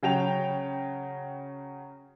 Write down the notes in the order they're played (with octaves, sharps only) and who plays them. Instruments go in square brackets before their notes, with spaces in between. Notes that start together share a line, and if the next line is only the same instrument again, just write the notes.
[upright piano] C#3 F#3 G5 F7